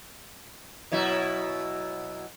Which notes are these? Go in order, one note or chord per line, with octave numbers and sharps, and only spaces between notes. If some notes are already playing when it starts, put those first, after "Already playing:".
B2 F#3 E4